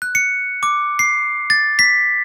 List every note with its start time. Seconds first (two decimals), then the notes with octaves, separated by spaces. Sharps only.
0.02 F#6
0.15 C#7
0.63 D6
0.99 C7
1.50 A6
1.79 B6